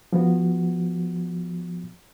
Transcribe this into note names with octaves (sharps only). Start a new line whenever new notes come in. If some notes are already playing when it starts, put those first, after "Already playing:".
F3 B3 F#4